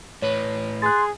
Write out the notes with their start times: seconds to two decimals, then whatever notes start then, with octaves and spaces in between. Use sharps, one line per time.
0.22 A2 B4 C#5
0.82 G#4 C6 F#6 A6